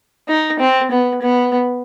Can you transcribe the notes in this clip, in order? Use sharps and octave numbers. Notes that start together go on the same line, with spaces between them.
D#4
C4
B3
B3